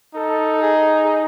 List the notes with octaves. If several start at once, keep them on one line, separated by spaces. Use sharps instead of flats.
D#4 A4
G#4